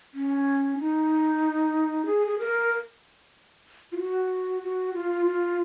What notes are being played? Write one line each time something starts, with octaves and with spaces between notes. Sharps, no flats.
C#4
D#4
G#4
G#4
A#4
F4
F#4
F#4
F4
F4